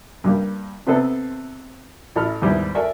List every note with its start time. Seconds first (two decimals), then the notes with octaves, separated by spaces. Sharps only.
0.24 G2 G3 A#3
0.87 C3 B3 C4 A4 B4
2.16 A1 A4 B5 F6
2.42 D#2 G#2 G3 B3 E4
2.75 F#4 A4 A#4 D5 E5 G#5